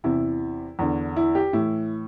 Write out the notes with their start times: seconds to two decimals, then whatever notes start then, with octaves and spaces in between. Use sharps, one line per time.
0.04 E2 C3 E3 E4
0.79 E2 D3
1.16 E4
1.35 G4
1.53 A2 E3 E4